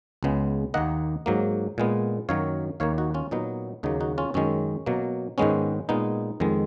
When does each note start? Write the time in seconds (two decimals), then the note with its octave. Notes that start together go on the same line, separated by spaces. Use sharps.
0.23 C#2 C#3 G#3 B3
0.74 D#2 D#3 A#3 D#5 F#5
1.26 G#2 F#3 A#3
1.78 A#2 G#3 B3
2.29 F#2 D#3 F#3 A#3 C#5 F5
2.80 D#2 D#3 A#3 C#5 F5
2.98 D#4 F#4
3.14 C#4 F4
3.31 A#2 F#3 B3 D#4
3.83 D#2 C#3 F#3 A#3 D#4
4.00 D#4 F#4
4.18 C#4 F4
4.34 F#2 D#3 G#3 C#4
4.86 B2 F#3 A#3
5.38 G#2 D#3 G#3 B3 C#4
5.89 A#2 G#3 B3 D#4
6.40 F2 D#3 G#3 B3